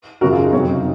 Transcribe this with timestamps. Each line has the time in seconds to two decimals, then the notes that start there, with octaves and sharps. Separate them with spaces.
0.21 F#2 C#3 F3 F#4 A#4
0.32 F4 G#4
0.43 D#4
0.53 F2 C3 F#3 C#4
0.68 D#4